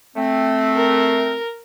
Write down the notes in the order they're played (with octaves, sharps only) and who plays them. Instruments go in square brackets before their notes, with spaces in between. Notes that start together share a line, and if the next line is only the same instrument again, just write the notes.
[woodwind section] A3 C4
[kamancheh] A#4